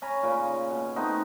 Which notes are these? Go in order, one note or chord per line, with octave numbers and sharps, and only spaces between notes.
C#4 G#5 A#5 B5
A#2 C#3
B2
A3 B3 C4 D#4